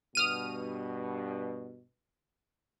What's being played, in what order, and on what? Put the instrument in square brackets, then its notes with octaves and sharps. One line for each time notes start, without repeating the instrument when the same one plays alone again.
[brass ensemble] G2 B2 [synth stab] D#6 F6 D#7